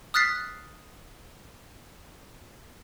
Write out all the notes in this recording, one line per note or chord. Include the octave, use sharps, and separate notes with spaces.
D#6 F6 F#6 A6 B6 C7